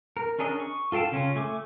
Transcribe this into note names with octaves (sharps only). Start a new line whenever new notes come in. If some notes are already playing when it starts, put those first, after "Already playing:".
A#4
C#4 D4 G#4 A#4 D#5
C#6
F4 A4 F5 G5 A5
C#3 C#4 F4
A3 G#5 D6